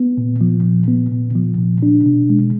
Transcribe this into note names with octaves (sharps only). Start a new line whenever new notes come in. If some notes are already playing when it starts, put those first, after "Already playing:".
Already playing: B3
A#2
F3
A#2
B3
A#2
F3
A#2
D4
B2
G#3